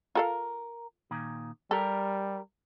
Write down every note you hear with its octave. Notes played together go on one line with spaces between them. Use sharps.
F4 A4 A#4 F5
A#2 D#3
G3 G4 A4 A#4